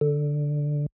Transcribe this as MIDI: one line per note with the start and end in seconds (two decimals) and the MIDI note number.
0.01 0.86 50